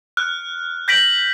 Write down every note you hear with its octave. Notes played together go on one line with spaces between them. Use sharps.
F6 F#6
G6 A#6 B6 D7 F#7